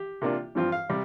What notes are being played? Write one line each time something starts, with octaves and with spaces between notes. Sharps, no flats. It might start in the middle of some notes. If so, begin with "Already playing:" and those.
Already playing: G4
C3 A#3 D4 F4
G2 F3 C4 F4
F5
C3 G3